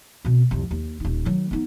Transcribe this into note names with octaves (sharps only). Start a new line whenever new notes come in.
B2 C4
C2 F2
D#2
D#1 D#4
D#3 F#3
B3 D#4